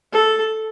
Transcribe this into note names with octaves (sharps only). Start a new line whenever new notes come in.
A4